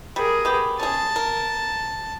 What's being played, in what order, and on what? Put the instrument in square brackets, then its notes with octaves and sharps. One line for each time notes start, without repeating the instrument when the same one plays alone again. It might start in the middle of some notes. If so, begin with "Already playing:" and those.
[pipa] G3 [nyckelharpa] G#4 A#4
[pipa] B3 G4
[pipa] C#4 G#4 [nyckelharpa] A5
[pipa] A#4